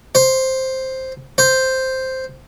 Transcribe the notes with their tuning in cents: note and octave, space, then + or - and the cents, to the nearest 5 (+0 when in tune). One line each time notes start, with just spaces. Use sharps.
C5 +5
C5 +0